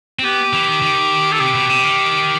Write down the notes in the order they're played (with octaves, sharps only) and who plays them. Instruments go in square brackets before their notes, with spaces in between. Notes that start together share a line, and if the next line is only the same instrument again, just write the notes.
[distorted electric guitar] C4
[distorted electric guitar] B3 [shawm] G4
[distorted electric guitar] E3
D#3
D#3
[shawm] A4
[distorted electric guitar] C3 [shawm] G4
[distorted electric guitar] B2
C3
D#3